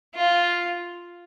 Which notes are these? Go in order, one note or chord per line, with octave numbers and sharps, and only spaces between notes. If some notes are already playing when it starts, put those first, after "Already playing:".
F4